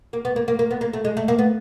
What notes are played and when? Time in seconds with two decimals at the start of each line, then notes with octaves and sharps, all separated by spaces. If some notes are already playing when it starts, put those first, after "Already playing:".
0.13 A#3
0.25 B3
0.36 A#3
0.48 A#3
0.59 A#3
0.71 B3
0.81 A#3
0.93 A3
1.05 G#3
1.17 A3
1.28 A#3
1.38 B3